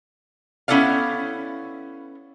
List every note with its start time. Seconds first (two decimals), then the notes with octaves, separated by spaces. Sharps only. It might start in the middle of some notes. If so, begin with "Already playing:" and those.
0.68 B3 C#4 E4 A4 D5 F5